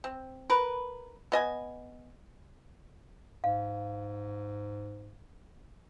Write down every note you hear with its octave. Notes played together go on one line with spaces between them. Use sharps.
C4
A#4 B4
B3 D#5 G#5
G#2 F5